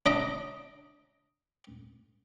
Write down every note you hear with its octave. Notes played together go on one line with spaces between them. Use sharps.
D4 D#5 A#5